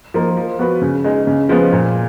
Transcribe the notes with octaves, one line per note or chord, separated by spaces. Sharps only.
F3 A#3 D#4
F3
B3 F#4 B4
C#3
G#3 D#4
C#3
F3 G#3 B3
A#2